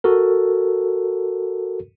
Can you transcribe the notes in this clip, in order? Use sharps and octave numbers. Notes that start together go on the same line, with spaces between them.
F#4 A4 A#4